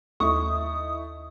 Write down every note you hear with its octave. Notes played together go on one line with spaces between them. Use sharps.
D#2 A3 D#4 E4 C#6 D#6